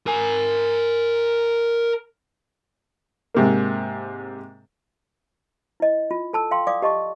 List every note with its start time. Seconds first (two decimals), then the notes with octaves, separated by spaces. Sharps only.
0.07 A#4 G#5
3.35 G#2 C3 A#3
5.80 E4 D#5
6.11 F4
6.33 A4 A5 E6
6.51 F5 G5 C6
6.67 D5 F5 D6 D#6
6.82 G4 D#5 A5 C#6